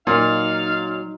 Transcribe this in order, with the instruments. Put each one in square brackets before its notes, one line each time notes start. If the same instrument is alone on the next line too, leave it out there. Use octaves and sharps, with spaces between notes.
[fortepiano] A#2 [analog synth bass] F#3 [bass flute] D#4 [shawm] F5